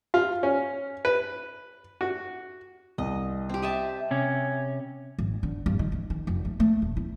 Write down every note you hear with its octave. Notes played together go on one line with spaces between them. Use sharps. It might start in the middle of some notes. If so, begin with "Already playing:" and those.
F4
C#4
B4
F#4
C2 D#5
C4 G4
D#5 E5 A5
C3 C#4
G#1
D3
G2
D#3
E3
D#3
F1
A3
A3
D#1
E4